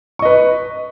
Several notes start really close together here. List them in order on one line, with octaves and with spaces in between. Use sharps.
C#6 D#5 B4